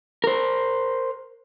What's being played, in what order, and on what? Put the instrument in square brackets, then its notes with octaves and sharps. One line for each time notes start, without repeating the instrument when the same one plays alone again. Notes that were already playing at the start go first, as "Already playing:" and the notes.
[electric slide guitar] A#4 C5